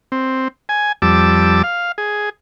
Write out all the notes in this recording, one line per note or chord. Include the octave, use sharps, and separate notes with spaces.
C4
G#5
F2 G3 A5 D6 E6
F5
G#4